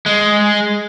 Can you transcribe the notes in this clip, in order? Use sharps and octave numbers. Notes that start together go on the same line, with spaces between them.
G#3